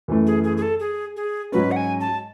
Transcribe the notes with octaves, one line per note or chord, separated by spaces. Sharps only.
F#2 E3 A3
G#4
G#4
G#4
A4
G#4
G#4
G#2 F#3 C#4 B4
F#5
G#5
A5